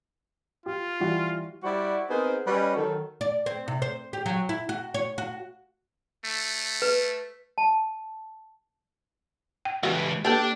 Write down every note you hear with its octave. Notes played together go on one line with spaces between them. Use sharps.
F4 G4
E3 G3 F#4
G3 E4 F#4 C5 D5 F#5
B3 C4 D#4 G#4 A#4 C5
G3 C#4 F#4 B4 D#5
D#3 F#3 A4
D5
C4
C3
C5
G4
F#3
E4
F#4
C#5
F#4
A3
B4
A5
G5
C#2 E3 F#4 G4
A#3 D4 G4 A4 B4